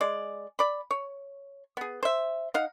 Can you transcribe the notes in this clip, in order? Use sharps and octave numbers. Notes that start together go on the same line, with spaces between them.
G#3 D5
D5 B5
C#5
B3 G#4
C5 E5
D#4 F5 F#5